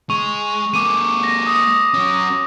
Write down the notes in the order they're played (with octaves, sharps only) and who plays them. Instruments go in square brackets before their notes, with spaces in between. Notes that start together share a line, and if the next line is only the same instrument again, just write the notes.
[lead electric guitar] G#3 [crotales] C#6 F7
[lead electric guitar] G#3 A#3 [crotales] D6 D#7
[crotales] A#6
D#6
[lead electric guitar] F#3 C#4